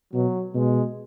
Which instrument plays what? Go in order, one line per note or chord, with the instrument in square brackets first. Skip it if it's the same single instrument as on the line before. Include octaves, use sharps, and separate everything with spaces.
[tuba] B2 [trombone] F#3
[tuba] B2 [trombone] G#3